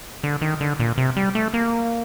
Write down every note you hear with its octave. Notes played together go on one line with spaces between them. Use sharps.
D3
D#3
D3
A#2
C3
G3
A3
A#3